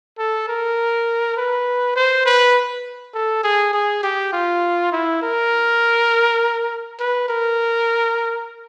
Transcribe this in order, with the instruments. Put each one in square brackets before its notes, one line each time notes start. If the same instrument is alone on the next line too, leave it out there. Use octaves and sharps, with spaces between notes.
[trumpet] A4
A#4
B4
C5
B4
A4
G#4
G#4
G4
F4
E4
A#4
B4
A#4